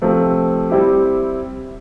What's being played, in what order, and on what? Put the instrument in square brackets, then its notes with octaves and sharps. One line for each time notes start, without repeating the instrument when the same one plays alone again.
[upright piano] C3 F3 A3 C4
G3 C4 E4 G4